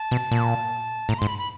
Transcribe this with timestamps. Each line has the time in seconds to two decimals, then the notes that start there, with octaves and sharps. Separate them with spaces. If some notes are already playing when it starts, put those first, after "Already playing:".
Already playing: A5
0.11 B2
0.31 A#2
1.09 A2 A#5
1.19 G#2 C6
1.28 B5
1.38 B5